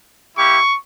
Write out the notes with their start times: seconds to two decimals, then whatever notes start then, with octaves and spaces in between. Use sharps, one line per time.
0.36 A#3 E4 G4 C#6